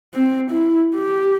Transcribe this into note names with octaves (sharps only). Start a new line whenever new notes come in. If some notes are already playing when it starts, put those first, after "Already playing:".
C4
E4
G4